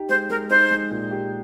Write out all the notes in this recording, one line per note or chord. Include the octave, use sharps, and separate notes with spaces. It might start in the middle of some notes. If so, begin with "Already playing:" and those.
Already playing: D#4 G4
G#3 C5
G#3 A#4
D#4 C5
G#3
A#2
G4